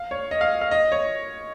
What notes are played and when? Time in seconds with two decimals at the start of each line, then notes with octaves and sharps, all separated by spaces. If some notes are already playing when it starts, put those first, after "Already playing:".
Already playing: F5
0.11 C#5
0.31 D#5
0.41 F5
0.61 F5
0.71 D#5
0.92 C#5